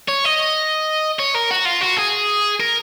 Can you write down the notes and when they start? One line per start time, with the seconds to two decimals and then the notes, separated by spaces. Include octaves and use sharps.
0.09 C#5
0.25 D#5
1.19 C#5
1.34 A#4
1.51 F#4
1.65 F4
1.81 F#4
1.97 G#4
2.60 A#4